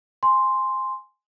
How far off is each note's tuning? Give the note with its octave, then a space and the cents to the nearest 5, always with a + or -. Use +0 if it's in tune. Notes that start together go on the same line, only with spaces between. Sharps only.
G#5 +0 C6 +0